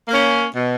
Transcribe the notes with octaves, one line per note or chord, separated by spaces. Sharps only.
A#3 C#4
B2